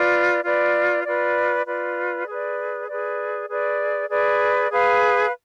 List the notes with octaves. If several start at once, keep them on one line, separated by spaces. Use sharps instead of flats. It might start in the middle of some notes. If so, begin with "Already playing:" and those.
Already playing: F4 B4 D5
F4 B4 D5
F4 B4 D5
F4 B4 D5
G#4 B4 D5
G#4 B4 D5
G#4 B4 D5
G#4 B4 D5
G#4 B4 F5